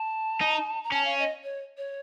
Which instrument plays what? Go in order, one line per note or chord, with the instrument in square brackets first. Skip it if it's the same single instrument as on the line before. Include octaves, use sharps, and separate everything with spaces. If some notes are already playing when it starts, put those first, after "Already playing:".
Already playing: [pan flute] A5
[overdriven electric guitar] D#4
[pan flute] A#5
[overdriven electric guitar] C#4 [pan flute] A5
[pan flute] F5
D#5
C#5
C#5